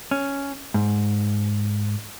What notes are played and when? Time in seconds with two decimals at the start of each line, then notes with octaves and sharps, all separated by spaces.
0.11 C#4
0.74 G#2